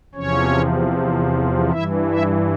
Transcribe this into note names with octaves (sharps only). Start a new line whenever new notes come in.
E2 C3 F3 C#4 C#5
G2 E3 E4 E5
E4 E5